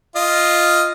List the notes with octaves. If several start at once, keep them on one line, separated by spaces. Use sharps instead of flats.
F4 D#5